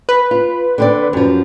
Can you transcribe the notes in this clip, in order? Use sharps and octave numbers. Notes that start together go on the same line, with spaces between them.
B4
F4
D3 C4 D5
F#2 F3